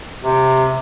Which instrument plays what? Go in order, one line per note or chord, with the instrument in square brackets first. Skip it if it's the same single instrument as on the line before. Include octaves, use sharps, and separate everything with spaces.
[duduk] C3